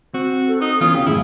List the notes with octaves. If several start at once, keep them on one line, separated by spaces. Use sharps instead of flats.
C4 F#4
A4
D#4 D#6
E3 B3 C#4 F4
C#2 C#4 G4 F5
F#2 A2 D#3 E4 G#4